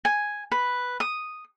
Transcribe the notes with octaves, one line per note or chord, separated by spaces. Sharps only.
G#5
B4
D#6